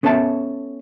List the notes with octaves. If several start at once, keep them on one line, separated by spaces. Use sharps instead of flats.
B3 C#4 A4 E5 A5